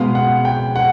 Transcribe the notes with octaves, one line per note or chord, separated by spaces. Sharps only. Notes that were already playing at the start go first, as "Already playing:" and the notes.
Already playing: B2 G#3 B3 F5
F#5
G5
F#5